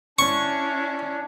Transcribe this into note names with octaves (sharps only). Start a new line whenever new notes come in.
C#4 D4 E4 C#6